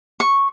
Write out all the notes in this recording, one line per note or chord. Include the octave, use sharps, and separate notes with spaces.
C#6